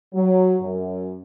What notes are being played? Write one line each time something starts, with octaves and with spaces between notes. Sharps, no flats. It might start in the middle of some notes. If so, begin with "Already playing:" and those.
F#3
F#2